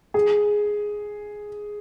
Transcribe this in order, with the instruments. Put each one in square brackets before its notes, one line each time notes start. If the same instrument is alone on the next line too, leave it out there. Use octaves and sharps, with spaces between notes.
[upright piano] G#4